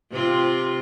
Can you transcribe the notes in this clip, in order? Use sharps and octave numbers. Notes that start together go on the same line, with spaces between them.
C3 C4 F4